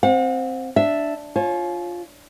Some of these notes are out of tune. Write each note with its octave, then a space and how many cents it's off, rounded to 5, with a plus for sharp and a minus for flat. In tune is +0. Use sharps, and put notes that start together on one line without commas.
C4 +0 F#5 -45
D4 +0 E5 +0
F4 +5 C#5 -30 G#5 +45